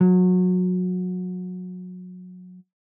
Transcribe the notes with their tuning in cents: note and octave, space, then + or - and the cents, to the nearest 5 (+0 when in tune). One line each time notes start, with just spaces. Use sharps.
F#3 -25